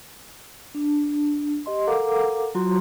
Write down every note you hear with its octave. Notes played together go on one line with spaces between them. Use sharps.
D4
G4 D#5 C6
A4 A#4 F5 F#5 A#5 D6
F#3 F4 F#4 A#5 C6